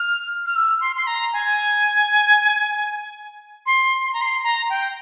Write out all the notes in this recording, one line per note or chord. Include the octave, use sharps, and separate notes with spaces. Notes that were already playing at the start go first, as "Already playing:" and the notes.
Already playing: F6
F6
E6
C6
C6
A#5
G#5
C6
C6
A#5
C6
A#5
G5